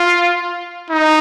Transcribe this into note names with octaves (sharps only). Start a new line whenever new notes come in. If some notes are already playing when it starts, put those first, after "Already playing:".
Already playing: F4
D#4